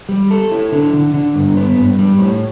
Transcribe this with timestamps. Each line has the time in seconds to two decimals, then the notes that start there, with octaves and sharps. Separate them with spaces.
0.09 G3
0.31 A4
0.51 E4
0.72 D3
0.94 D3
1.14 D3
1.35 G2
1.57 B3
1.78 G2
1.99 G3
2.19 A2